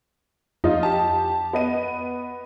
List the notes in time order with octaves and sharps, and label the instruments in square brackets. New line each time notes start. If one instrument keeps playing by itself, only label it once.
[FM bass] F2 [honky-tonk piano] D#4 F4
[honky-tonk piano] G4 A5
B3 D#5 D#7